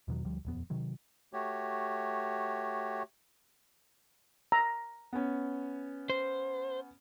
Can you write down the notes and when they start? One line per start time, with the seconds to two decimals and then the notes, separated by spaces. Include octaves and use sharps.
0.08 E2 B2 D#3 F#3
0.25 D2 F3 G3
0.45 D#1 F2 B3
0.70 C3 D#3 F#3
1.33 A3 F#4 G4 C#5
4.52 A#5
5.13 B3 C#4
6.10 C5